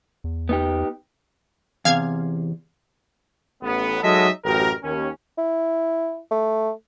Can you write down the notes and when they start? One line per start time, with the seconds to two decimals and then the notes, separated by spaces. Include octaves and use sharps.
0.24 E2
0.49 B3 D#4 G4
1.85 E2 C3 F5 F6 G#6
3.62 A1 B3
4.03 F#3 G#3 D#4 A4 D#5 E5
4.44 A1 F#2 F#4 G4 A#4
4.82 D#2 C#4
5.38 E4
6.31 A3